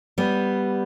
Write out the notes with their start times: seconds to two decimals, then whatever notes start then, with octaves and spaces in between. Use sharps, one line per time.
0.18 G3 B3